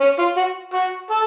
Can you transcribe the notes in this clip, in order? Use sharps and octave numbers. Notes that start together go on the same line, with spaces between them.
C#4
F4
F#4
F#4
A4